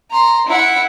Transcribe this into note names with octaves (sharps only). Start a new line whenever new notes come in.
A#5 C6
E4 F#5